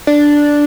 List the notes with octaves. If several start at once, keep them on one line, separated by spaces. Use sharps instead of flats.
D4